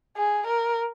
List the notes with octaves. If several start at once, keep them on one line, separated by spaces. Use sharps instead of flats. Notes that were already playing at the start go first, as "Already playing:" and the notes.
G#4
A#4